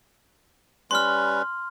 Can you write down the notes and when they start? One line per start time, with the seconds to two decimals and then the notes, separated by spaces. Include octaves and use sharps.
0.91 G3 C#4 B4 C6 F6